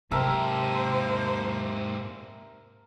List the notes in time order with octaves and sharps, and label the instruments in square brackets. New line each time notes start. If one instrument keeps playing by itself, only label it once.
[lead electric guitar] G#2 G4 [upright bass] C3 [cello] A#3 C5 [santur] A#4 E5 A5